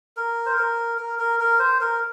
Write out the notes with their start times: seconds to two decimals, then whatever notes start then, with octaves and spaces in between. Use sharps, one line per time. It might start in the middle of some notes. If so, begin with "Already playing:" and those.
0.17 A#4
0.46 C5
0.57 A#4
0.98 A#4
1.19 A#4
1.40 A#4
1.59 C5
1.81 A#4